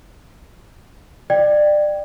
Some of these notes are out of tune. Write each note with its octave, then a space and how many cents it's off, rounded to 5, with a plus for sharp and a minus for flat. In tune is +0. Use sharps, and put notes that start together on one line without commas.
D5 +25 G5 +0